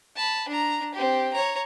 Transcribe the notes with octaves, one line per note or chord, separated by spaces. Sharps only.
A5 B5
D4 A#5
C4 G4
C#5 A#5